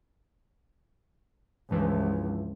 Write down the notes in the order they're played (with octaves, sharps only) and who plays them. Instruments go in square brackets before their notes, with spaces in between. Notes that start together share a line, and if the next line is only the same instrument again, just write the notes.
[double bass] C#2 [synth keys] G2 E3 F3